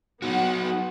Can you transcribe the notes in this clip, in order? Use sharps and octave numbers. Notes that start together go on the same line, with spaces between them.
F#3 B3 D#4 F#4 F#5